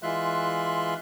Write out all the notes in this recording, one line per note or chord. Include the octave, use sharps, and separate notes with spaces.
E3 G#3 F4 E5 C6 F#6